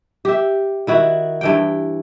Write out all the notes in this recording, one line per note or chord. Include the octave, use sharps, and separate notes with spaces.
G4 E5
D#3 E4 F#4
G2 E3 G5